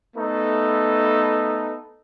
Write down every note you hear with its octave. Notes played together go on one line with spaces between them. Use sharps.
A3 B3 D#4 A4